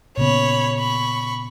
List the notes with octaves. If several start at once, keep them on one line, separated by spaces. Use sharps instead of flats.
A#2 C#3 B3 C#5 B5
B5 C#6